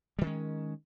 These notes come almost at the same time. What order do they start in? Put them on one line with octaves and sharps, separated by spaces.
G3 D#3 C#4 G#3